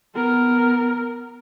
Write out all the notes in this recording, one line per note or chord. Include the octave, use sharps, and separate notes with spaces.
B3 A#4